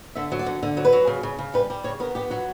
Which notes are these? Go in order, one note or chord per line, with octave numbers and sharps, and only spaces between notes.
D3 E5
F#3
D5
D3
D3
F#3
B4
F#3
C#3
C#3
C#3
G3 B4
G3
C#3 C#5
B3 A#4
B3 G4
F#3 F#4